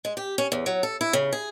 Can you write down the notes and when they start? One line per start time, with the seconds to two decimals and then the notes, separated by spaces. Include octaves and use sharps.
0.05 G#3
0.17 G4
0.38 C#4
0.52 E2
0.66 F#3
0.83 A4
1.01 E4
1.13 C#3
1.33 G#4